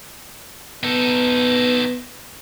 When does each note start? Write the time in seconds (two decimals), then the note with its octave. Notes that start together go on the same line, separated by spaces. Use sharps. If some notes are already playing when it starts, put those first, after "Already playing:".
0.84 B3 D#4 A4